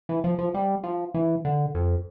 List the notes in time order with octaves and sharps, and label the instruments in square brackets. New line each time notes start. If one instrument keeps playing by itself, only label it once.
[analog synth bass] E3
F3
F3
G3
F3
E3
D3
F2